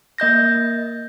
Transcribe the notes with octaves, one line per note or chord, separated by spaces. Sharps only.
A#3 D#5 G6 A#6